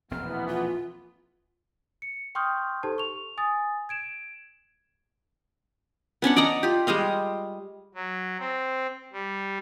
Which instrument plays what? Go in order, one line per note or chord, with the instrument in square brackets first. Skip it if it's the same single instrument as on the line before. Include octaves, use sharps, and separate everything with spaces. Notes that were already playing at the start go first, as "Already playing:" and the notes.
[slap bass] E1 A#1 C4 [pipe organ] E3 B3 [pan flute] F6
[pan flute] F4
[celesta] C#7
G5 C6 C#6 D#6 F6 G6
D#4 G4 A4 C5 A5
C#6 F7
G#5 D#6 A6
G#6 D7 E7
[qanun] B3 C#4 D4 F#5
D5 D#5 F#5 A#5
F4 G4
G3 G#3 D#5 F5
[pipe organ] F#3
C4
G3